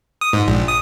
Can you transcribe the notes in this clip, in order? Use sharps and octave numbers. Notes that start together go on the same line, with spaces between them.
D#6
G#2
A#1
D#6